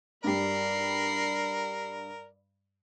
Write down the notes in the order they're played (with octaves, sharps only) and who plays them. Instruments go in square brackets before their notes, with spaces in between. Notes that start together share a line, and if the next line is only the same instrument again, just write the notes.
[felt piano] G2 G3 [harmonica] A#4 [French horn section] D5 [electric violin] B5 C7